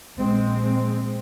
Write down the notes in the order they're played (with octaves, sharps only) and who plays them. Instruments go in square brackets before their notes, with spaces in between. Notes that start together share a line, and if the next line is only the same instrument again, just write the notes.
[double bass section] A#1 A#2 G#3 C4